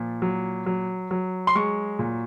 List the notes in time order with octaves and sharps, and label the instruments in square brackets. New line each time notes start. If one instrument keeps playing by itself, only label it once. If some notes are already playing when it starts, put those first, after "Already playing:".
Already playing: [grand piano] A#2 F3
F#3
F#3
F#3
C6
G#3 C#6
A#2